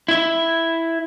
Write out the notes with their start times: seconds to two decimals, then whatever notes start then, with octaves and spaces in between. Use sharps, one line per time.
0.08 E4 E5